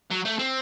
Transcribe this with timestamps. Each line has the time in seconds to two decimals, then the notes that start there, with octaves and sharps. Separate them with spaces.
0.10 F#3
0.25 A3
0.39 C4